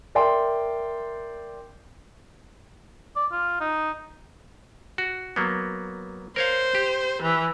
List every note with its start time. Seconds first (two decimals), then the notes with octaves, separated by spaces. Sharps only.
0.15 A#4 D5 E5 G5 C6
3.16 D5
3.32 F4
3.60 D#4
4.98 F#4
5.36 F#3 A#3 B3
6.36 A#4 C5 C#5 F5
6.75 G4
7.22 E3